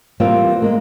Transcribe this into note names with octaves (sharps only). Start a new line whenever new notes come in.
E3 G3 A#3 C4 F4
G#3 A#3 C4